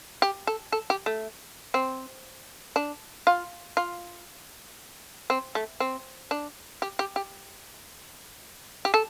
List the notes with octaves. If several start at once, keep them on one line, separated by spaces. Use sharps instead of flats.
G4
A4
A4
G4
A3
C4
D4
F4
F4
C4
A3
C4
D4
G4
G4
G4
G4
A4